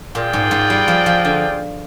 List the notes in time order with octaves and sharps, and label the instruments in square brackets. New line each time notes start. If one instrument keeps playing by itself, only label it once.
[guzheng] A#2 [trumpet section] F4 G#4 D5 G5
[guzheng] G#2
G#2
G3
F3
F3
D3